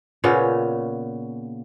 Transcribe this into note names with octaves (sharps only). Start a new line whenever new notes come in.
A#2 C#3 B3 C#4